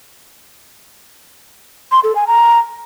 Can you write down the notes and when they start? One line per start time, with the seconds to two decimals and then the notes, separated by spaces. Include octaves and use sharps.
1.92 C6
2.04 A4
2.15 G#5
2.27 A#5